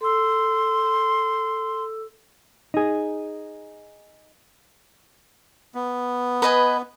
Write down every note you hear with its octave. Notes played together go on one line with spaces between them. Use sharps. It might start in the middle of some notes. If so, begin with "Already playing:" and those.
A4 C6 E6
D#4 G#4
B3
B4 D#5 G#5